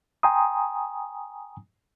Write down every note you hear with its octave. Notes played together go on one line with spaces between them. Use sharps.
G5 G#5 A#5 C6 D#6